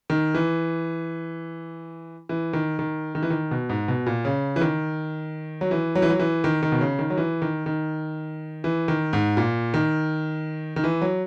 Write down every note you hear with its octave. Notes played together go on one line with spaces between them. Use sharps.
D#3
E3
E3
D#3
D#3
D#3
E3
D#3
B2
G#2
B2
A#2
C#3
E3
D#3
F#3
E3
F#3
E3
F#3
E3
D#3
D#3
B2
C#3
D#3
F#3
E3
D#3
D#3
E3
D#3
G#2
A#2
D#3
D#3
E3
F#3